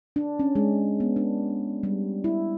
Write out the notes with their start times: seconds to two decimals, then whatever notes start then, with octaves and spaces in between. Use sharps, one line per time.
0.16 D4
0.39 C#4
0.55 G#3
1.00 B3
1.16 D4
1.83 G3
2.24 E4